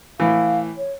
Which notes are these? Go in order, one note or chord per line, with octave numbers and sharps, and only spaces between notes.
A2 E3 F5
C#5